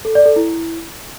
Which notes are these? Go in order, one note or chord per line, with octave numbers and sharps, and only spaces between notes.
A4
D5
A4
E4